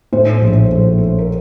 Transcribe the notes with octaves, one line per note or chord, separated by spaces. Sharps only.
A2 C5
A#1
A#1
A3
A#4